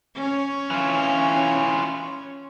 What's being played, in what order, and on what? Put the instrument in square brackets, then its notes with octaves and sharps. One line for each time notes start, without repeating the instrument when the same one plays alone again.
[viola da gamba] C#4 C#5
[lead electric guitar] E3 F4